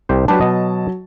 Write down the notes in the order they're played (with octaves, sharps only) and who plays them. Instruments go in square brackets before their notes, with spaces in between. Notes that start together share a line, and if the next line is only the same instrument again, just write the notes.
[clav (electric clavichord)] C2 G4 C5
[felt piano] F#3 A5 [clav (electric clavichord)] D4 G4 B4
[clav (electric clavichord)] B2 D#5